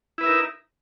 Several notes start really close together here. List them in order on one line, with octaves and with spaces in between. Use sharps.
E4 B4 E5 A#4 D#4